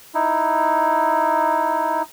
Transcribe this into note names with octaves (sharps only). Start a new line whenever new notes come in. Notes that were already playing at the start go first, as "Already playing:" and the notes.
D#4 E4